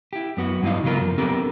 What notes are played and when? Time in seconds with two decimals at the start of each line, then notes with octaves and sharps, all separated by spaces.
0.13 E4 G4
0.37 F#2 B3 F#4
0.62 G2 E3 F#3 D#4 F5
0.83 C#3 E3 F#3 B3 F4 A#4
1.01 F#2 F3
1.18 B3 C4 D4 G4 A4 A#4